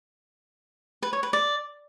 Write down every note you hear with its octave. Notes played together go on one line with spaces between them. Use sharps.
B4
C#5
B4
D5